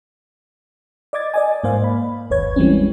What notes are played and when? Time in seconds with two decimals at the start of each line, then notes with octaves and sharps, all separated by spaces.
1.13 D5 D#5 D6 G#6 A6
1.34 D5 D#5 G#5
1.64 G#2 A#3 C5 F5
1.84 B5
2.30 G1 D#2 B4 C#5 G#6
2.56 E3 G3 G#3 C4 C#4